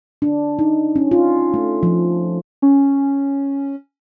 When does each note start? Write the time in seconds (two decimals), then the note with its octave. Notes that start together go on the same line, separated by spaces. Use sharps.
0.22 D4
0.59 D#4
0.96 C#4
1.11 F4
1.54 A3
1.83 F3
2.62 C#4